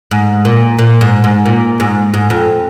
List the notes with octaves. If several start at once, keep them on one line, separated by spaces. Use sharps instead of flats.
G#2
A#2
A#2
G#2
G#2
A#2
G#2
G#2
F2